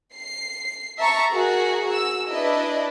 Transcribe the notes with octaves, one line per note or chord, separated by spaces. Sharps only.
C7
E5 A5 A#5 C#6
F#4 G#4 A#4
E6
D4 E4 B4 D#5